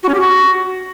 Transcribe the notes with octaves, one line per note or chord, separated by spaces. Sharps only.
F#4
C#4
G4
F#4